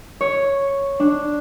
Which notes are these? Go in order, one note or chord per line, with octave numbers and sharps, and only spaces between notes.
C#5
D4